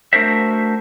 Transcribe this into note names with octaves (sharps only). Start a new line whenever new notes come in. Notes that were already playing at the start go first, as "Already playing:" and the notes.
A3 D4 F#4 A#4 C5 E5